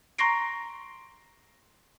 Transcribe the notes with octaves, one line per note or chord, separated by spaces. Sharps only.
A#5 C6 C#6 A#6 C7 D7